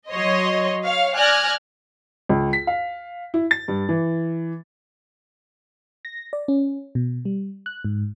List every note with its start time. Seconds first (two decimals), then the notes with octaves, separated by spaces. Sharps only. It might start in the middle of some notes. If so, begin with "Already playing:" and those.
0.10 F#3 C#5 D#5 C6
0.85 C#5 F5
1.16 D5 G#5 F6 F#6 G#6 A#6
2.29 C#2
2.53 B6
2.67 F5
3.34 E4
3.51 A6
3.68 G2
3.89 E3
6.05 A#6
6.33 D5
6.48 C#4
6.95 B2
7.25 G3
7.66 F#6
7.85 G#2